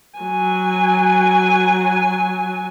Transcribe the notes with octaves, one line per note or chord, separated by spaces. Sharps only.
F#3 G#5